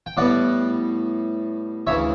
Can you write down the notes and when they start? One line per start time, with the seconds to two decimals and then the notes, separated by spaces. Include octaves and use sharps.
0.06 G5
0.17 A2 G3 B3 D5 F#5
1.87 D2 C#5 E5
1.89 C#3 E3